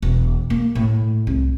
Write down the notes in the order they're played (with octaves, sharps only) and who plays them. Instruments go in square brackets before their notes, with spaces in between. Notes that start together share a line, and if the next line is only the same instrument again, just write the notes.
[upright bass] E1
A#3
A2
C2